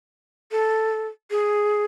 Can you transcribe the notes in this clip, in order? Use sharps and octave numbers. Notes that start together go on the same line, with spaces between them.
A4
G#4